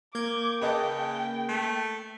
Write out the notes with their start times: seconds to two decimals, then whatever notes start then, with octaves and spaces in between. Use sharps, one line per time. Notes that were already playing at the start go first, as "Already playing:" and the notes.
0.15 A#3 D6 G6 G#6
0.61 C#3 B4 D#5 G5 A5
1.49 A3